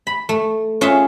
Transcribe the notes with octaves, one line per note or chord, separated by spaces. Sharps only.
B5
A3
C#4 F4 G#4 E5